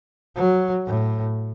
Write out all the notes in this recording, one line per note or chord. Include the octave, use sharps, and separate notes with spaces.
F#3
A2